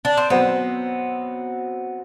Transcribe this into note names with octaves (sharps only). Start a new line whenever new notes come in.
D4
C4
B2 F#3 B3 C4 F#4 C5